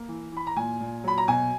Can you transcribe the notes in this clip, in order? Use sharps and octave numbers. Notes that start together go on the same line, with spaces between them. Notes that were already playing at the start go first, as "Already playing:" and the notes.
Already playing: A#3
E3
E3 B5
A#5
A#2 G#5
A#2
F#3 B5
A#5
B2 G#5